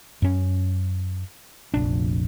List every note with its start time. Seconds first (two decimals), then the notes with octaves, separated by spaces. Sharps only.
0.22 F#2 C#4
1.74 F1 A#1 D4